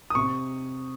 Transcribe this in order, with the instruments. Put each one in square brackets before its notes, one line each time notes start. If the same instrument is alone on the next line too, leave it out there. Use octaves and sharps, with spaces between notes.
[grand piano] D#6
[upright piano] C3 [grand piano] C#6